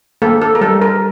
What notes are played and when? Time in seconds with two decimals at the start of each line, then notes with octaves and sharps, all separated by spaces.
0.22 A#3 A4
0.42 A4
0.55 A#4
0.61 G3 A4
0.82 A#4